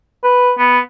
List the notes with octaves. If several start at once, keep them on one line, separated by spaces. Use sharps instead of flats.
B4
B3